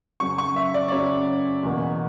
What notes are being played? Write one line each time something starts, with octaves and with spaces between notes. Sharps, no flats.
F#2 C#3 F#3 C#6
C#6
E5
D5
D5
F#2 C#3 F#3 C#5
E2 B2 A#3